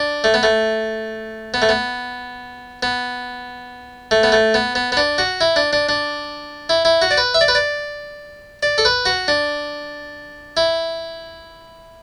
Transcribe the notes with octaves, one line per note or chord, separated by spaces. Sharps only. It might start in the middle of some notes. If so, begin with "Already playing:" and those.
Already playing: D4
A3
B3
A3
B3
A3
B3
B3
A3
B3
A3
B3
B3
B3
D4
F#4
E4
D4
D4
D4
E4
E4
F#4
D5
B4
E5
D5
B4
D5
D5
A4
B4
F#4
D4
E4